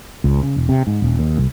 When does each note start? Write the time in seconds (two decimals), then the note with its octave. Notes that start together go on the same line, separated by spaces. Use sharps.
0.24 C#2
0.43 C#3
0.56 E1
0.69 C3
0.87 G#2
1.02 D#1
1.19 D#2
1.38 C2